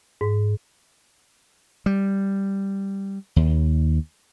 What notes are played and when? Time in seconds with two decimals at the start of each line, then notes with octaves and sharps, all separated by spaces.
0.21 G#2
1.86 G3
3.36 D#2